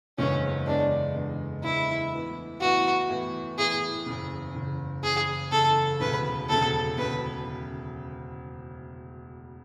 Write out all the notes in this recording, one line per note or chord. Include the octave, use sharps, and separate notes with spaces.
F#1 E2 D3 G#3 B3 C#4
F#1 E2 D3 G#3 B3 D4
F#1 E2 D3 G#3 B3
F#1 E2 D3 G#3 B3 E4
A2 E3 B3 E4
A2 E3 B3 E4 F#4
A2 E3 B3 E4
A2 E3 B3 E4 G#4
F#1 E2 C#3
F#1 E2 C#3
F#1 E2 C#3 G#4
F#1 E2 C#3 A4
E1 D2 C#3 B4
E1 D2 C#3 A4
E1 D2 C#3 B4